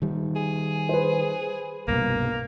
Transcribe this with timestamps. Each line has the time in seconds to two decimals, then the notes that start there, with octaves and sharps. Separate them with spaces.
0.02 D#3 G3
0.36 G#4
0.89 B4 C5
1.88 C2 G2 B2 A#3